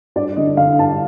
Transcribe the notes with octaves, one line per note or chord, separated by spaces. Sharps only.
G2 D5
D3 D#5
D3 F5
G2 A5